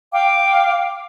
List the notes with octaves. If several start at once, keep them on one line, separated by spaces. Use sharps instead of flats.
F5 G5 D6